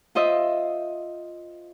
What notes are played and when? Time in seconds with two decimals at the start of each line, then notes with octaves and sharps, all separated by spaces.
0.15 F4 C5 D#5 E5